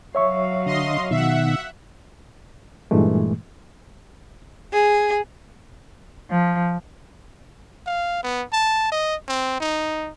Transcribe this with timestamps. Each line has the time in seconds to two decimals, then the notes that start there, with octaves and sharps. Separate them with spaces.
0.15 F#3 F#4 C#5 E5 F5 C#6
0.66 D3 D#5 C6
1.11 B2 D#3 E5 F#5
2.91 G2 A#2 E3 G#3 A3
4.72 G#4
6.30 F3
7.86 F5
8.23 B3
8.53 A5
8.92 D#5
9.28 C4
9.60 D#4